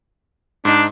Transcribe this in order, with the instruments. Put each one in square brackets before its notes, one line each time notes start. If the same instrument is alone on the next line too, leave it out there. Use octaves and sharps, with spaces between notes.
[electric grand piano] G#2 D#4 [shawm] D4